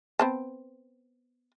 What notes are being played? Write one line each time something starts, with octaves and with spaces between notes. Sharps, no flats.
B3 C4 A5